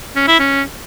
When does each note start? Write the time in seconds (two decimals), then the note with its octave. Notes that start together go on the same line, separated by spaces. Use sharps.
0.16 C#4
0.28 E4
0.39 C#4